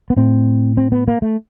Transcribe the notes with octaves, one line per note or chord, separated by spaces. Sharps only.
B3
A2 C4
C4
B3
A#3
A3